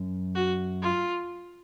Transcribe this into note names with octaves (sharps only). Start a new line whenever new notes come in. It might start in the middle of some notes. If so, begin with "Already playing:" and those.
Already playing: F#2
F#4
F4